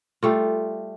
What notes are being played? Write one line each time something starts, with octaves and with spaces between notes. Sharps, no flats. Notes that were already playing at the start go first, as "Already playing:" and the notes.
G3 A3 F4